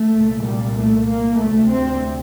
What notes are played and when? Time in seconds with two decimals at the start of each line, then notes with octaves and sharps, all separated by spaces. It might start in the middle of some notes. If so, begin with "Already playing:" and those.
Already playing: A3
0.15 C2 A#2
0.46 G3
0.77 A3
1.09 A#3
1.39 D2 C3 A3
1.71 C4